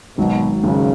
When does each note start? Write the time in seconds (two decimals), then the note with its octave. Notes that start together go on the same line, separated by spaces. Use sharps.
0.17 G#1 G#2 B2 F#3
0.64 G#1 G#2 C#3 F#3